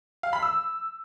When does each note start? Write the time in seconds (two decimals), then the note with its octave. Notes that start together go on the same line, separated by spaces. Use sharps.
0.23 F5
0.33 B5
0.42 E6